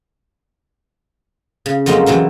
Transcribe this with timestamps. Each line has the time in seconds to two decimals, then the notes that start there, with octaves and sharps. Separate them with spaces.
1.66 C#3
1.86 F2 F#3 G#3 A#3 C#4
2.06 C3 E3 F#3 E4